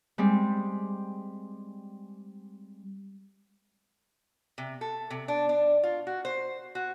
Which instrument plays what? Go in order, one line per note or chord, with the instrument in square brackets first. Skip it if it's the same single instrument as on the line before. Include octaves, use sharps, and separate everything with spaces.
[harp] G3 G#3 C4
[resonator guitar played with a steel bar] C3
A4
C3
D4
D4
F4
F#4
C5
F#4